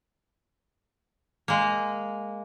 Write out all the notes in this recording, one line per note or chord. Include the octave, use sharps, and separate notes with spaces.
G#3 A#3